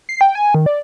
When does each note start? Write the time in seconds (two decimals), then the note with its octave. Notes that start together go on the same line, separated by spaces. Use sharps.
0.09 C7
0.21 G5
0.35 G#5
0.55 D#3
0.66 D5